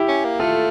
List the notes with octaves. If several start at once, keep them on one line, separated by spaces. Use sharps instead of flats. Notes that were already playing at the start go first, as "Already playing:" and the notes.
Already playing: E4 G4
C#4
A#3
A3 F4 A4